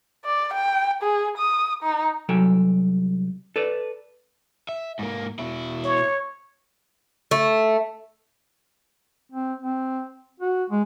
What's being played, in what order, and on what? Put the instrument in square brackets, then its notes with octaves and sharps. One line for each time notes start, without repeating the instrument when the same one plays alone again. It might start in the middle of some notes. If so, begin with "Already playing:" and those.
[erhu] D5
G5
G#4
D#6
D#4
[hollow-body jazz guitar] C2 F#3 A4 G5 G#5
A4 B4 D5
[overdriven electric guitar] E5
G#2 A#3
B2 E4
[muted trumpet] C#5
[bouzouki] A3
[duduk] C4
C4
F#4
G#3